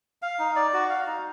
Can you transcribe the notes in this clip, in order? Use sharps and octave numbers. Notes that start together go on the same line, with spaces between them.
F5
D#4
D5
F#4
F5
D#4